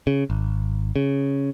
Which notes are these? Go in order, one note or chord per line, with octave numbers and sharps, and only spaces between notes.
C#3
G#1
C#3